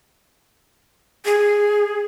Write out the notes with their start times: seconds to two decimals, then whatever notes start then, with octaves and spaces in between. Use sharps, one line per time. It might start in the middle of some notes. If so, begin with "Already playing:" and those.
1.25 G#4